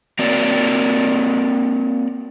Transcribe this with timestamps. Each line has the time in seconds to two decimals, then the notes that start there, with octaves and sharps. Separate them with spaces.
0.19 A#3 C4 F#4 A#4 C#5 D5